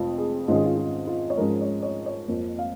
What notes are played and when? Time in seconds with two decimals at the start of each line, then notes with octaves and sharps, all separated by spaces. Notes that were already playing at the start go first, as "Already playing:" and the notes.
Already playing: F1 F2 F4
0.18 G#4
0.48 G#2 D#3 G#3 C#4 F4
0.55 G#4
0.64 F4
0.77 F4
1.07 F4
1.30 C#5
1.37 G#2 F3 G#3 C#4 A#4
1.61 C#5
1.83 C#5
2.06 C#5
2.28 F2 F3 A#3
2.59 F5